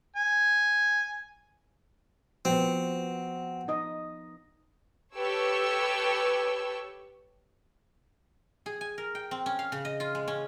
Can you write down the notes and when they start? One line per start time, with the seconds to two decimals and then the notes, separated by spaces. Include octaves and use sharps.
0.16 G#5
2.45 F3 B3 C4 F#4
3.68 D#4 D#5
5.18 G4 A4 B4 C#5 C#6 E6
8.66 G#4
8.81 G#5
8.98 A#4
9.15 G5
9.31 C4
9.46 C#4
9.59 F5
9.72 C#3
9.85 D#5
10.00 F4
10.15 G#3
10.28 C#4